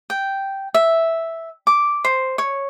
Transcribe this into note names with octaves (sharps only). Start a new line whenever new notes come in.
G5
E5
D6
C5
C#5